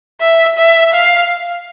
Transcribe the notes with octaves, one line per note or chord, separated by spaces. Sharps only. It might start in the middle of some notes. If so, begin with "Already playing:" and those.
E5
E5
F5